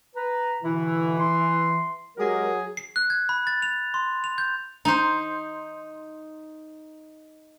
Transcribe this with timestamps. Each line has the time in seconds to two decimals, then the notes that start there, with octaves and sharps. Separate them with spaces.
0.16 B4 A#5
0.63 B2 D3 E3 E4
1.19 C6
2.17 F#3 G#3 G4 G#4 A#4
2.77 C7
2.96 F#6
3.10 G#6
3.29 B5
3.47 A6
3.62 F7
3.94 C6
4.24 F7
4.38 G6
4.85 D#4 C5